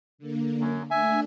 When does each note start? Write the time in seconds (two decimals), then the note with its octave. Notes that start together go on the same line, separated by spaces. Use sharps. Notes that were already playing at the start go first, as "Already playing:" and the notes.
0.18 D3 A#3
0.61 F#2
0.91 A3 D4 E5 G#5